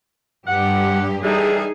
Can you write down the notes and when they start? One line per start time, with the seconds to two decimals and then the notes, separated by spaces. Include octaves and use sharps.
0.47 G2 G4 F#5
1.23 D3 E3 G3 D#4 G#4